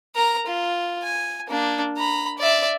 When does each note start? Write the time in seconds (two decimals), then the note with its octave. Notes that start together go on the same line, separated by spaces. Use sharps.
0.15 A#4 A#5
0.46 F4
1.03 G#5
1.48 A#3 D4
1.98 A#5 B5
2.38 D5 E5